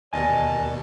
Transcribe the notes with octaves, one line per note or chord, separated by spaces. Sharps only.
D#2 B2 A#4 D5 D#5 G#5 A5